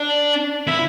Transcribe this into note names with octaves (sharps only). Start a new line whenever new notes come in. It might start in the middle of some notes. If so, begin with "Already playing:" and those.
Already playing: D4
E4